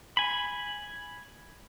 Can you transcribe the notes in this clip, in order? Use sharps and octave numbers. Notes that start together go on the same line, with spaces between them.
G#5 B5